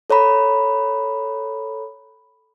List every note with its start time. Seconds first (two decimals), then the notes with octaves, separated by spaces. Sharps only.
0.10 A4 C#5 A#5 B5